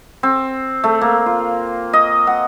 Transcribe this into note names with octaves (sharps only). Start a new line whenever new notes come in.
C4
A3
A#3
F4
D#5
F#5